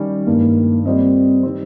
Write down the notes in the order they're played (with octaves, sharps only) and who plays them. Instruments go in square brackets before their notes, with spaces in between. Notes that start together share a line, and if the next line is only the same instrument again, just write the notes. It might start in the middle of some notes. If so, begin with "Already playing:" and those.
Already playing: [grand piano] D#3 G3 C#4 G4
[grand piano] G2 D#3 G#3 [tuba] A#3
[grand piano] G3 A#3 F4 C5 D#5 [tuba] C4
[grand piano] D#3 G3 C4